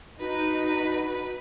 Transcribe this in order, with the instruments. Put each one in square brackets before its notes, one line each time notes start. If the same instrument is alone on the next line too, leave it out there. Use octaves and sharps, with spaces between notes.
[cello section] D#4 [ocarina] F#4 [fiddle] B4